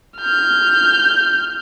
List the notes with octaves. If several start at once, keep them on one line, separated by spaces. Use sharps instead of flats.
F6 G6